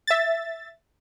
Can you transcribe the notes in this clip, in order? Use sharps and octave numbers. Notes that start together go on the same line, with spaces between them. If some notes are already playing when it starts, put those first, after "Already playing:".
E5 A6